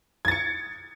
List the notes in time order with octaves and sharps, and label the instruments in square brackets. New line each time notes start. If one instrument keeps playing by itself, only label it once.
[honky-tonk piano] G#6
A6
C#7